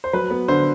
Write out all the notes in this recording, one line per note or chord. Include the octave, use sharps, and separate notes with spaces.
C5
F#3 B4
B3
D3 C5